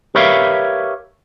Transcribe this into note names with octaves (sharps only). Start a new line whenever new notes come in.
G4 A#4 B4 C#5 E5 F5